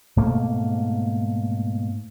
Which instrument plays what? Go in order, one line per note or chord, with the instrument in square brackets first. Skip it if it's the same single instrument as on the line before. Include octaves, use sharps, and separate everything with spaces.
[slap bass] G#2 B2 A3 A#3